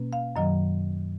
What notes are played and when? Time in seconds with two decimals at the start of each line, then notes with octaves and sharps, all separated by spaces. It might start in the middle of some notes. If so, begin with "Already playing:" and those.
Already playing: B2 A#3 C#4
0.13 F5
0.36 F#2 D#3 F#3 D#5